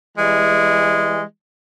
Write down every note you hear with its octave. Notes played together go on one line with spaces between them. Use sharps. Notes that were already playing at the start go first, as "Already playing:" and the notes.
E3 G3 G#3